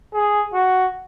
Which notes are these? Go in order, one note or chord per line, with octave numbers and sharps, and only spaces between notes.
G#4
F#4